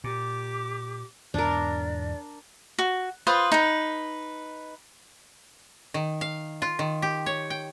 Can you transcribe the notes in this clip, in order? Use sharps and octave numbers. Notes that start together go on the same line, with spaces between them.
A#2 G4 D6
E2 G#2 B2 D4 A#4 D5
F#4
F4 B4 C5 D#6
D#4 B4
D#3
F5
F4
D#3
G4
C#5
G5